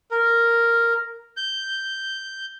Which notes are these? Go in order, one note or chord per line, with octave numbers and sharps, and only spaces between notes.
A#4
G6